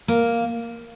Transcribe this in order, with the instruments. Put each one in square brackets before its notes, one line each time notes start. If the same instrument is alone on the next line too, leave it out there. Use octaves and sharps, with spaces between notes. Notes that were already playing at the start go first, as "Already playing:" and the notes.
[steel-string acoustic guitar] A#3